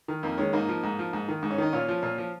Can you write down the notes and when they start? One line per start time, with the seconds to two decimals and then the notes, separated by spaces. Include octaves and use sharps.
0.08 D#3
0.23 F2 A#3 D#4
0.38 D#3 G#3 C#4
0.53 G#2 A#3 D#4
0.68 F3
0.83 G#2
0.99 F3
1.13 G#2
1.28 D#3
1.43 G#2
1.51 C#4
1.58 D#3 D#4
1.73 A#2 C#4 F4
1.88 F3
2.03 A#2
2.18 F3